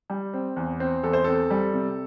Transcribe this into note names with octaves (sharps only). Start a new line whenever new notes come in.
G3
C4
E2
C4
E2 A4
C5
C4 A4
G3
C3